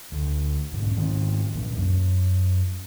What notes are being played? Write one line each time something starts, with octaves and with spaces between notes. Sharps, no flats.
D2
B1 G#2
G#2 D#3 C#4
C2 A#2
F#2